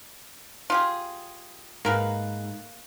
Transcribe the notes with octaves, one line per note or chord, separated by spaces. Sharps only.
F4 G4 G#4
G#2 A#3 A#4 B4